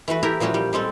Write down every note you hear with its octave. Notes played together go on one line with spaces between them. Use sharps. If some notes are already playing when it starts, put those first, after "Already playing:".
E3 A3 F#4 B4
E4 G4 A#4
A#2 F3 G3 C#4 F#4
G3
G3 G#3 C4 A4